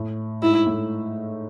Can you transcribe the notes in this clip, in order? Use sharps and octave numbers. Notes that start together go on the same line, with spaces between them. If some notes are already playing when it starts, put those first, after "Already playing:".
Already playing: A2
G#2 E4
A2